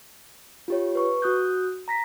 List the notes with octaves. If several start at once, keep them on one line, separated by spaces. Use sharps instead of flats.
F4 G4 C#5
B4 C#6
F#4 D#6 F#6 G6
A#5 A#6 B6